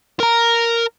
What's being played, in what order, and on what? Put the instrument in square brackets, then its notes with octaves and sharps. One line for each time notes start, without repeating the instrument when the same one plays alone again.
[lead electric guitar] A#4 A#5